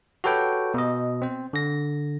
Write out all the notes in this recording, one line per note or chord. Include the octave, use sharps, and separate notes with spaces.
F#4 G4 A4 B4 C#5 G5
B2 D#5
C4 C5
D3 A#6